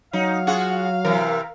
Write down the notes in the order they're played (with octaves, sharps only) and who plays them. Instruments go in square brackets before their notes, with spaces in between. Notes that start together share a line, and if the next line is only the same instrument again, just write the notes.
[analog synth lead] F#3 [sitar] D#4 [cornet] F5
[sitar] F4 F#4 G#4 [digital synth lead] F#5
[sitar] C3 E3 [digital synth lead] A#4